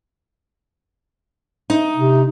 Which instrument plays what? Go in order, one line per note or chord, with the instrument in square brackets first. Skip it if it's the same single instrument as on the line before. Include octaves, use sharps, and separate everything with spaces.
[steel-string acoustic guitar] D#4
[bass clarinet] C3